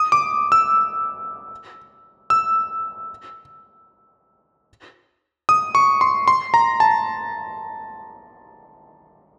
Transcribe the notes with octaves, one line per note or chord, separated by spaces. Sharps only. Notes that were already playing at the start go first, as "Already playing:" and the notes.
Already playing: D#6
D6
E6
E6
D#6
C#6
C6
C6
A#5
A5